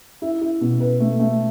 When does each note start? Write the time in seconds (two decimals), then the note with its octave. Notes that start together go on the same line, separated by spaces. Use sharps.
0.22 E4
0.41 E4
0.61 B2
0.80 B4
1.00 A3
1.19 A3